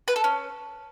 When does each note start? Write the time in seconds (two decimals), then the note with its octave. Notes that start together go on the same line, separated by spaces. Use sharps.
0.08 B4
0.16 A4
0.24 C#4